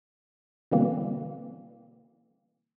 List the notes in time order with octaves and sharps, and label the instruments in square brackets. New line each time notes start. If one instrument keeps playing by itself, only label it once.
[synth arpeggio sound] B2 D3 E3 G3 A#3 C4